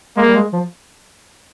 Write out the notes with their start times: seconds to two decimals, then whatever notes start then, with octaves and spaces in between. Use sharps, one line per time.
0.17 G#3 A#3
0.29 G3
0.35 G#3
0.53 F3